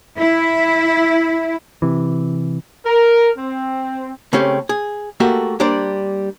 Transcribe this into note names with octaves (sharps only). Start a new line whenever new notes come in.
E4
C3 E3
A#4
C4
C#3 A3 C4 C#4 G4
G#4
A3 A#3 F#4 G4 A4
G3 A#3 D4 C5 D5